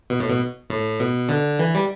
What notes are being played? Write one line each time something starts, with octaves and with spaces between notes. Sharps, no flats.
B2
A2
B2
A2
B2
D3
E3
G3